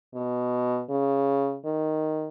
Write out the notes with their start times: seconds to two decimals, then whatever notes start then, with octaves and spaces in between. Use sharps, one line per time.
0.15 B2
0.89 C#3
1.65 D#3